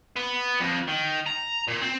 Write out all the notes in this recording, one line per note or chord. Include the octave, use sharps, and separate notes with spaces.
B3
F2
D#3
A#5
A#2
C4